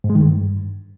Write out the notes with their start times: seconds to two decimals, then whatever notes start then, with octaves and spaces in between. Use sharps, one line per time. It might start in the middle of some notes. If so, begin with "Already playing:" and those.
0.04 G#2
0.10 G#3
0.15 D#3
0.21 G2